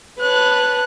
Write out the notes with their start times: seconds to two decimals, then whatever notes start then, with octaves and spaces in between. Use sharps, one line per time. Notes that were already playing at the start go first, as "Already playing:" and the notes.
0.20 B4 C#5 A5 F#6